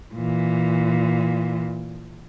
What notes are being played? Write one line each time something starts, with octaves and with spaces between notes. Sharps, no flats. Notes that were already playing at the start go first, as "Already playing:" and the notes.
A#2 E3